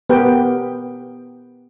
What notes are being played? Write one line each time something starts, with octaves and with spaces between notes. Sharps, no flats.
B3 G4 A#4 B4 G5